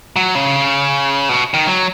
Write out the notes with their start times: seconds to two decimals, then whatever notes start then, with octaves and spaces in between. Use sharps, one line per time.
0.16 F#3
0.35 C#3
1.29 B2
1.54 D#3
1.67 F#3